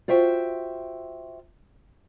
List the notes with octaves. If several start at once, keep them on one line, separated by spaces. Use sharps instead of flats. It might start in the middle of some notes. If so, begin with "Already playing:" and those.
F4 F#4 C5 E5 G5